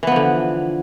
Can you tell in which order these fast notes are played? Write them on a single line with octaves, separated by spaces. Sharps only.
E3 B3 F3 D3